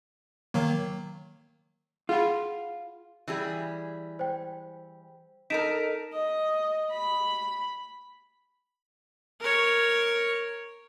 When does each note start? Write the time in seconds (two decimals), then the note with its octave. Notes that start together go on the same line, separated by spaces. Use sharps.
0.54 D#3 F#3 A#3
2.09 F4 G#4 F#5 B5
3.28 E3 G3 G#4
4.19 C5 G5
5.50 D#4 A4 A#4 B6 D7 E7
6.13 D#5
6.91 B5
9.40 A#4 C#5